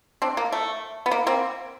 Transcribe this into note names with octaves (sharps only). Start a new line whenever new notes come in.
C4 D4
A#3
A3
B3
A#3
A#3 C4